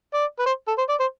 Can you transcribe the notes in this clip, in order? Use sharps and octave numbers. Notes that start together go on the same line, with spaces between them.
D5
B4
C5
A4
C5
D5
C5